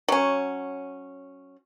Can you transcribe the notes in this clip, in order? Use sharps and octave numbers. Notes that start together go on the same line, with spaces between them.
F#3 C#4